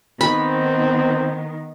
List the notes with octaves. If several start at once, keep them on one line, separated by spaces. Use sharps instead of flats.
D#3 B3 C4 B5